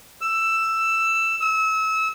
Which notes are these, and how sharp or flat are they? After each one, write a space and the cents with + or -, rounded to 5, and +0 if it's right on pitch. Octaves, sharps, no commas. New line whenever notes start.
E6 +10
E6 -30